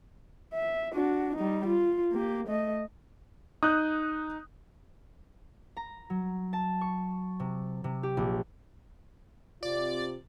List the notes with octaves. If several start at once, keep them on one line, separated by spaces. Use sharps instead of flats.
E5
D4 F#4
G3 D#4
F4
A#3 G4
A3 D#5
D#4 D#6 F#6 G6
A#5
F#3
A5
C#6
C3
C3
G4
A#1
C3 F4 D5